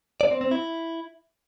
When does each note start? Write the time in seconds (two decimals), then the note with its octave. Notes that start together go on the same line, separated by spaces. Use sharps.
0.21 D5
0.31 C4
0.41 C4
0.51 E4